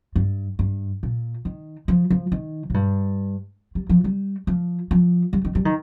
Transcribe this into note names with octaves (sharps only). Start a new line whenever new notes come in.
G2
G2
A#2
D#3
F3
F3
D#3
A#2
G2
G3
F3
G3
F3
F3
G3
D#3
G3
D#3